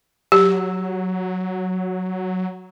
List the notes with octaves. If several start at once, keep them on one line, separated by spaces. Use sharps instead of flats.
F#3 G4